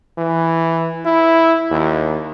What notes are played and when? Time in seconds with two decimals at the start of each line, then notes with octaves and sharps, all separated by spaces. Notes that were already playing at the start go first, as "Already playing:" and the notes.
0.18 E3
1.05 E4
1.71 D#2